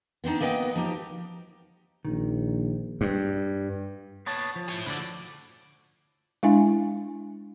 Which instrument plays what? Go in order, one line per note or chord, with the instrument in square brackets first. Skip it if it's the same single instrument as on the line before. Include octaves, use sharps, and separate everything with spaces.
[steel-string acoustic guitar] B3 C4 D4 D#4
A#3 B3 B4 D#5 F#5 G5
F3 D#4 G4
[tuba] A#1 [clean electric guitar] D#3
[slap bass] G2
[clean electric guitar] B3 C#5 A5
F3
[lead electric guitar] E4 C#5
[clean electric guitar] D2 D3 [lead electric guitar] A2 D5
[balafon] G#3 D4 E4 E5 G#5